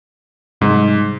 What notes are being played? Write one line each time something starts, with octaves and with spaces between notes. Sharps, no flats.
G#2 C3 F#3 G3